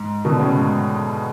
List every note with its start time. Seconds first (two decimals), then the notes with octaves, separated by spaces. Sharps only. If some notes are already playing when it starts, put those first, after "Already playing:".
Already playing: G#2
0.25 B2 D3
0.40 A2 C#3
0.55 G#2